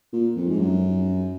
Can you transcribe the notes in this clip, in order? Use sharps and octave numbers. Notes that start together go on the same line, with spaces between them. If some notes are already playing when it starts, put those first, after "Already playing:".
A#2
F2
G#2
F#2